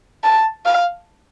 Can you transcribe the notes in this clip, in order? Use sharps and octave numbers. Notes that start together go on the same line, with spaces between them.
A5
F5